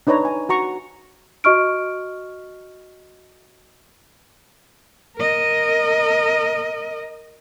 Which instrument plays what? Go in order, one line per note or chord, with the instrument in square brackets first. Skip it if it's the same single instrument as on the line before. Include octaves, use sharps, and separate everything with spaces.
[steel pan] D4 D#4 B4 C#5 A#5
G#5
F#4 A#5 C#6
[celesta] F#4 D#5 C#6 F6 D7
[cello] A#4 D#5